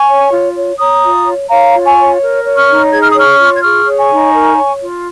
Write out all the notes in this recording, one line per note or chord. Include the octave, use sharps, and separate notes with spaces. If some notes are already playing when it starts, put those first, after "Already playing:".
Already playing: G#5 C#6
C#5
F4
C#5
C#5 A#5 D#6
F4
C#5
C#5 F5 A#5
F4
G#5 C#6
C#5
A#4
C#5
C#6 F6
D#4
G#4 G#6
F6
D#6
C#5 C#6 F6
F4
G#6
G#4 C#6 F6
C#5
G#5 C#6
D#4
A#4
C#5
F4